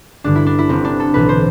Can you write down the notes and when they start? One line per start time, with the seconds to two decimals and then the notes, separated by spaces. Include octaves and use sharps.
0.24 G1 G2 D3 D4
0.36 E4
0.46 D4
0.59 E4
0.69 G1 G2 D3 C4
0.85 D4
1.00 A4
1.14 B1 A2 E3 B4
1.29 C5